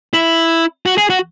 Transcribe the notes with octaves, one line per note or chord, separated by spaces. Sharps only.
E4
F#4
G#4
F#4